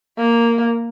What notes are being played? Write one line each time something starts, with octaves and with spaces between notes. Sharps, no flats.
A#3